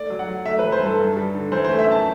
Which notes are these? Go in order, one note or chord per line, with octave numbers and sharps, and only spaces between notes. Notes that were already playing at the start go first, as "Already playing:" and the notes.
Already playing: A3 D5
F#3
F#5
F#3
A3 E5
E3 B4
C5
G2 A4
G2
G3
D3
E3 C5
A3 C5
E5
F#2 A5